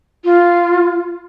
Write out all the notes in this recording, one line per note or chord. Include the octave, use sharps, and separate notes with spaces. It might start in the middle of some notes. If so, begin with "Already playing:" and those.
F4